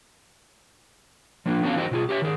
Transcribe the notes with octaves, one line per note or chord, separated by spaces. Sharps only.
F3 A#3 D4
B3 C#4 F#4 A4 D#5 F5
E3 D#4 F#4 C5 D#5
B2 F4 G#4
G4 C#5 D#5 E5
D#3 G#4